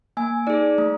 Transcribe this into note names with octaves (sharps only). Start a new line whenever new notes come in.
A#3 G#5
D#4 G#4 D5
A3